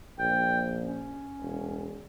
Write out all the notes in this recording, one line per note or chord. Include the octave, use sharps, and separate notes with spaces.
A#1 G5
C#4
E1